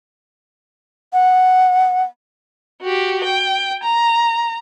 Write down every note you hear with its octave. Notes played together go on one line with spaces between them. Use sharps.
F#5
F#4 G4
G5
A#5